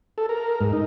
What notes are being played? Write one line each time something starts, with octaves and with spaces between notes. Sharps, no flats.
A4
A#4
G#2
D#4